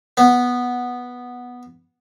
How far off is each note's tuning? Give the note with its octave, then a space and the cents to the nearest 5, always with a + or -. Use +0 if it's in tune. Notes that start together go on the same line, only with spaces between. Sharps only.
B3 -5